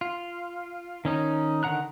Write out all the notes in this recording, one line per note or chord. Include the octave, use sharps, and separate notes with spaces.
F4
D#3 C#4 D#4
D3 D#3 F#5 A#5 F#6